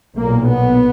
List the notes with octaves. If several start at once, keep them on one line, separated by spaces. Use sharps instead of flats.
B1 A#2 A#3
B3